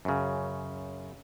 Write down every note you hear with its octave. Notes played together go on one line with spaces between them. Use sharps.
F#2 C#3